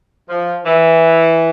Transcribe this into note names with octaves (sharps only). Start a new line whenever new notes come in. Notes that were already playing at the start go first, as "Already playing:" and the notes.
F3
E3